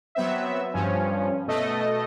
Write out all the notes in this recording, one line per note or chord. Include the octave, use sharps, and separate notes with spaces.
F#3 B3 C4 E5
G2 F3 C#4
B2 A3 A4 D#5